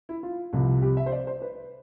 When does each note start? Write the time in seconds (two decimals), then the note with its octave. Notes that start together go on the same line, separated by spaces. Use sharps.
0.09 E4
0.23 F4
0.53 C2 C3 F3
0.82 G4
0.97 E5
1.06 C5
1.12 D5
1.27 C5
1.42 B4